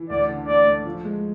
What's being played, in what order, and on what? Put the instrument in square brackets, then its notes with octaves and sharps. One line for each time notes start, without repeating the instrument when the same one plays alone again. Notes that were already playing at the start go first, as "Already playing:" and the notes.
Already playing: [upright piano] E3
[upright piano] D2 [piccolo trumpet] D5
[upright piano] D3
[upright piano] A3 [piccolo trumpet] D5
[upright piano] A3
F3
G#3